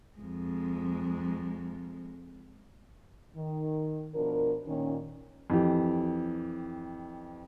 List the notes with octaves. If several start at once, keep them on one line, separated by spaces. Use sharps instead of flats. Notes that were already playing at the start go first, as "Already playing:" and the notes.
F2 G#3
D#3
B2 F3 D4 A#4
A#2 D#3 C#4
F2 E3 G4